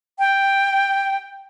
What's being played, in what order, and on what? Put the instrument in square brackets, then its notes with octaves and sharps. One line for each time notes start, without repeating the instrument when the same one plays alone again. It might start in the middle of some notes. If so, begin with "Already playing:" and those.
[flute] G5